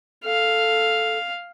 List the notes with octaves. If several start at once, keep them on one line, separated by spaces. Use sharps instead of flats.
A4 F5